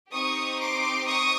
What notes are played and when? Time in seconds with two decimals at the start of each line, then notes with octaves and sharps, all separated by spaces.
0.12 C4 D#4 G4 C#6 D#6
0.60 C6 D6
1.07 C#6 D#6